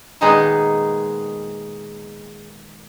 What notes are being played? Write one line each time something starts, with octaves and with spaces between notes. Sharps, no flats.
A#2 D#3 G#3 B3 D#4 G#4